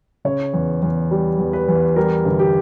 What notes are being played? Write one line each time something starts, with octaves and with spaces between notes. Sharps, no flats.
C#3 C#5
E2
E2
G3
E2
B4
E2
G3 A#4
G1
G4